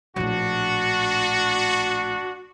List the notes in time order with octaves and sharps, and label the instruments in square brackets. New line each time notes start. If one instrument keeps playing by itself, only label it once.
[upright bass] A#1 A2 [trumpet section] D4 F#4